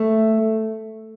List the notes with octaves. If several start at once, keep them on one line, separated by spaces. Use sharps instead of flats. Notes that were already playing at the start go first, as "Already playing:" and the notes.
Already playing: A3